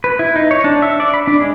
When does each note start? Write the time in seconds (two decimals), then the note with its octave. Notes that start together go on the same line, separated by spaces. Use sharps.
0.04 B4
0.19 E4
0.36 D#4
0.51 C#5
0.64 D4
0.82 E5
1.00 D5
1.14 B5
1.27 D4
1.41 G#3